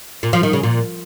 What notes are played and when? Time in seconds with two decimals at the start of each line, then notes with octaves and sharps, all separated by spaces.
0.23 A#2
0.33 F3
0.43 D#3
0.53 C#3
0.63 A#2